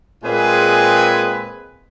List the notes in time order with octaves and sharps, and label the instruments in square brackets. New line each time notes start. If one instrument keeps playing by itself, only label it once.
[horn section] A#2 G#3 C4 G#4 B4 G#5